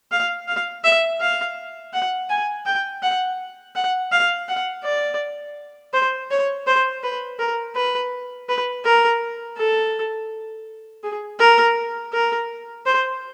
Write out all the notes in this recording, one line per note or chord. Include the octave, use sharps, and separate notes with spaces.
F5
F5
E5
F5
F#5
G#5
G5
F#5
F#5
F5
F#5
D5
C5
C#5
C5
B4
A#4
B4
B4
A#4
A4
G#4
A#4
A#4
C5